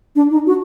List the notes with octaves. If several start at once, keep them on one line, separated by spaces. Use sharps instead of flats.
D4
D#4
F#4